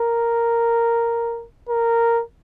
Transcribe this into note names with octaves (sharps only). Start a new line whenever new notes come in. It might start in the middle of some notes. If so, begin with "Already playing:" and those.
Already playing: A#4
A#4